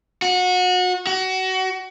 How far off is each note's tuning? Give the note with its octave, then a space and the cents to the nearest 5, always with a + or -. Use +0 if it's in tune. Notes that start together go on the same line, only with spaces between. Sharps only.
F#4 -30
F#4 +25